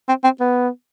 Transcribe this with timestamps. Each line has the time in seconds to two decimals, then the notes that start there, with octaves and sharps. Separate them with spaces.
0.09 C4
0.24 C4
0.40 B3